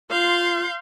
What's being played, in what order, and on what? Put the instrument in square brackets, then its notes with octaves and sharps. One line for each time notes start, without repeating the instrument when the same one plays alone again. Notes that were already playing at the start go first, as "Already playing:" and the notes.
[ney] F4 [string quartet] F5 C6 G6